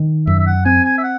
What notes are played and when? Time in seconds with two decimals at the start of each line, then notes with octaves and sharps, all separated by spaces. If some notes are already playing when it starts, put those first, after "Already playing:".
Already playing: D#3
0.27 F#2 E5
0.38 E5
0.46 F#5
0.65 C4 G#5
0.84 G#5
0.98 E5
1.03 F#5